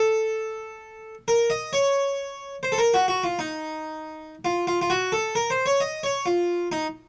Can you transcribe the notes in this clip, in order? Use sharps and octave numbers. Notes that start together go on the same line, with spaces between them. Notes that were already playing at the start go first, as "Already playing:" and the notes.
Already playing: A4
A#4
D#5
C#5
C5
A4
A#4
F#4
F#4
F4
D#4
F4
F4
F4
F#4
A4
A#4
C5
C#5
D#5
C#5
F4
D#4